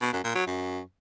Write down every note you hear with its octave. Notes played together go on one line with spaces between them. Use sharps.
B2
F#2
A#2
F#3
F#2